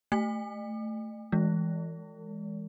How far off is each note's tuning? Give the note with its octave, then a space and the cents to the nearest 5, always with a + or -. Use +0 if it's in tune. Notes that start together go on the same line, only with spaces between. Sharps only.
A3 +0 G#5 -45
E3 +0 G#3 +0